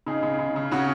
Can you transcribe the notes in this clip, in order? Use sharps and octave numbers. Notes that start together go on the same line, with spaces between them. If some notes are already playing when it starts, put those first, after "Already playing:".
C#3 D#4 G#4
C#3
C#3
C#3
C#3 C#4 F#4